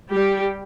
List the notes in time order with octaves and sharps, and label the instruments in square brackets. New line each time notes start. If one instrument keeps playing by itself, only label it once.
[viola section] G3 G4